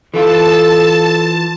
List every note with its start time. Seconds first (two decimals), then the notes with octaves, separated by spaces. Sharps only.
0.14 E3 F4 A4 A5